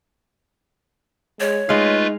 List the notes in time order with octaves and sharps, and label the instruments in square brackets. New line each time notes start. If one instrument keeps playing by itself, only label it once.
[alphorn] G#3 [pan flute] C#5
[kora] G#3 F5 [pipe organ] A3 F4 B4 [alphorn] D#4